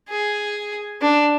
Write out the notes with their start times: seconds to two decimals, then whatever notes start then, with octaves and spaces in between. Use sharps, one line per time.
0.09 G#4
1.02 D4